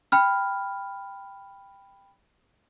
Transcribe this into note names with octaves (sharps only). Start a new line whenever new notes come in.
G5 B5 F6